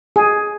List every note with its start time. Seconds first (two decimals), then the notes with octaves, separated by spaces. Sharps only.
0.16 G#4